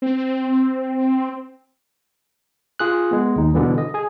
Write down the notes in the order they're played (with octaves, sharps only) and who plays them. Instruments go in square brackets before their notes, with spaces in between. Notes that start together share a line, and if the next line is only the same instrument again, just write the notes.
[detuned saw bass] C4
[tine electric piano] F4 G#4 F#6
G#3 B3
D#2 D#4
B2 D3 E3 G3
D#5
G#4 G#5